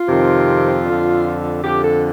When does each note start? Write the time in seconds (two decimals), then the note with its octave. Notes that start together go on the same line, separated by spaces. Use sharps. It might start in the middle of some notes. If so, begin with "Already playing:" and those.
Already playing: F4
0.08 F2 C3 D#3
0.86 F2 D3
1.63 F2 D3 G4
1.82 A4